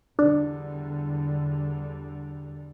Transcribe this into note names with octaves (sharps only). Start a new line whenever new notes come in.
E2 D3 G3 D4